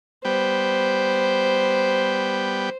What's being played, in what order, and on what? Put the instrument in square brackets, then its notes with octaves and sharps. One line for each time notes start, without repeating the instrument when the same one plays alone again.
[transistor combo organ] G3 B3 G5 [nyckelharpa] C5